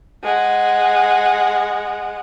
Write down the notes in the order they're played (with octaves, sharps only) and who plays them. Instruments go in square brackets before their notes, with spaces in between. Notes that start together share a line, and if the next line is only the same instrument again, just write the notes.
[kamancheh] G#3 F#5